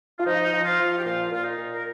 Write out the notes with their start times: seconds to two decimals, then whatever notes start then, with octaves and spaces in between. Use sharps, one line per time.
0.19 F4
0.25 F3 D#4
0.52 F3
0.65 F4
0.78 F3
0.98 G4
1.04 A#2 F4
1.30 A#2 F4
1.44 D#4
1.57 A#2
1.72 A#4